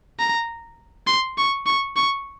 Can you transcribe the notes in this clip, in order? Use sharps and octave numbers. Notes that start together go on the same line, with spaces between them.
A#5
C6
C#6
C#6
C#6